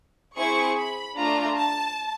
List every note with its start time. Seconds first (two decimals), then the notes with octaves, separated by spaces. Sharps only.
0.36 C4 E4 G#4 C#6
0.77 B5
1.17 A3 D4 F4 A#5
1.56 A5